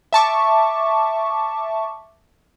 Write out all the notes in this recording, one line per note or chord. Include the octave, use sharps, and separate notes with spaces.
E5 A5 C#6 D6